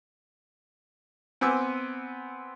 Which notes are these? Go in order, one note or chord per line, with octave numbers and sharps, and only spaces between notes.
B3 C4 G#5 D6 E6